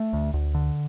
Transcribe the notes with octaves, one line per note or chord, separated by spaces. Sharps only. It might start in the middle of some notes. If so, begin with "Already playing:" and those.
Already playing: A3
D2
D2
D3